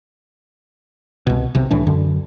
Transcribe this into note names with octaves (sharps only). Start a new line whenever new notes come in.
C2 B2
B1 C3
C2 A2 E3 D4
F#2 D3